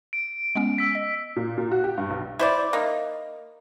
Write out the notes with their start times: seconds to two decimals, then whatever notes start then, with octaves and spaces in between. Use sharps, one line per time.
0.13 D7
0.55 G#3 B3 C#4
0.78 E6 B6
0.95 D#5
1.36 A#2
1.58 A#2
1.72 F#4
1.84 G4
1.98 G2
2.10 B1
2.39 E4 C5 D5
2.73 A#3 D#4